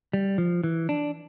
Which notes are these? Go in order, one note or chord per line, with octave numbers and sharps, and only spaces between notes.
G3
F3
E3
D4